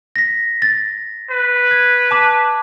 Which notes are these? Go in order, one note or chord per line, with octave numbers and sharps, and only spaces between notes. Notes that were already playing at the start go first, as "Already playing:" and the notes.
A#6 B6
A6
B4
G#6
A5 D6